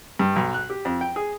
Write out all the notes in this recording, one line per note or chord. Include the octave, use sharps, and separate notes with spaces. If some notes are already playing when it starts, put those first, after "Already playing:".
G2
B1
F#6
G4
F2
G5
G#4